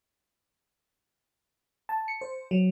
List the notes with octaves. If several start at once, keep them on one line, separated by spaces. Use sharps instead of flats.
A5
C#7
C5
F#3